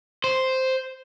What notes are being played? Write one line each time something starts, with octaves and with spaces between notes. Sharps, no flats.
C5